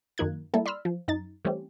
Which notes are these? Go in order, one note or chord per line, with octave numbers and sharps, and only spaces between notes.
F#2 D#3 A#3 D#4 F#6 G#6
G3 A#3 E4 A4
D5 B5 C6 E6 F6
F3
F#2 D#4 A6
E3 G3 A3 C4 C#4 G4